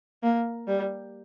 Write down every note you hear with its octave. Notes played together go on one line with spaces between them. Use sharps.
A#3
G3